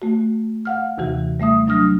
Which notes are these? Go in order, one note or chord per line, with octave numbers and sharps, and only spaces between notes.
A3 F#4
F5 F#5 F6
D#2 C3 E3 F#4
G3 A3 E5 D#6
F#3 D4 D#6 F6 A#6